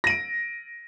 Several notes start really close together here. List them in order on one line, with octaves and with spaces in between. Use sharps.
A#6 D#7 D7